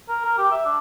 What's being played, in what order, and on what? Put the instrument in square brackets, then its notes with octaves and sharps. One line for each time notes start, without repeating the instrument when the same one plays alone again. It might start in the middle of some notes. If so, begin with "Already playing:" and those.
[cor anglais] A#4
A#4
G4
E5
D4